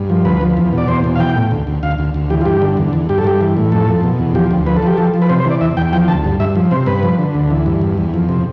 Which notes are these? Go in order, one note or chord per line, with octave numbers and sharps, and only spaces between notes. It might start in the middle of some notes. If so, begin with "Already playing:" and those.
Already playing: G2
F3
D2 B4
F3
E2
B2
D5
E2 C5
B2
F5
E3 G5
A2
D2
D2
D2 F5
D2
D2
E3 G4
F4
G2 G4
D3
E2
E2
G2 G4
A4
G2 G4
E3
A2
F2 A4
F2
B2
E2
F3 G4
D2
F3 B4
A4
F3 G4
F3 A4
F3
B4
C3 C5
C5
E3
D5
E2 E5
E2 G5
F3 G5
D2 A5
G2
G2 E5
F3
C3 C5
G2 B4
F3
D3
D2
E3
G2
E2
E2
F2
C3